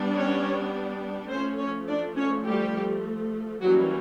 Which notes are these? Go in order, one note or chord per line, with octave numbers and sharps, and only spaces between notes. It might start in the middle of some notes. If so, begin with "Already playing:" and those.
Already playing: G3 B3 D4
C#4 C#5
F3 A3 C4 C#4 C5
C#4 C#5
D4 D5
C#4 C#5
G3 G4
E3 F#3 G3 A#3 C#4 F#4